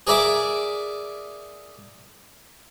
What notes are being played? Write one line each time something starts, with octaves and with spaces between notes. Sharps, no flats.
G#4 A#4 D5 E5 D6